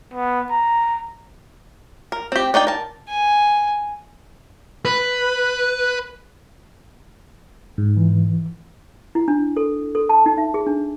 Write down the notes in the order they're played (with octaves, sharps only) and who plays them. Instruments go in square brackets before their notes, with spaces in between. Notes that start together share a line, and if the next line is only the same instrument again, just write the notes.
[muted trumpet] B3
A#5
[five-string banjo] A#4
C4 G4
D4 D#4 D5 G5
A#4 A5
[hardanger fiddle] G#5
[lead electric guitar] B4
[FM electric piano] G#2
[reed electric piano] E3
[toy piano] E4
D4
A4
A4
A5
D#4
E5
G#4
D4